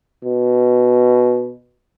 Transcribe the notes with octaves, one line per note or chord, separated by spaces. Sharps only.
B2